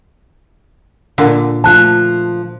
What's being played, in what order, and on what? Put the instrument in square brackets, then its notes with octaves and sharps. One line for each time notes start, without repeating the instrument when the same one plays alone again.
[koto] A#2 D3
[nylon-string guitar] F3 A3 F4 [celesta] A5 F#6